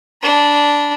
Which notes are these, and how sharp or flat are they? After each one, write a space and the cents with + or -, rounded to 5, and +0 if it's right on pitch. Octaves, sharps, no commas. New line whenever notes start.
D4 -10 B5 -30